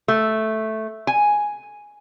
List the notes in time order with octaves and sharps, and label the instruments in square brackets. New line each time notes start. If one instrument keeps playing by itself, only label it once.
[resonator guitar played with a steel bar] A3
G#5